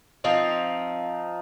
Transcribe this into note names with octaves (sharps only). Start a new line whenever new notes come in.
F3 C4 D#4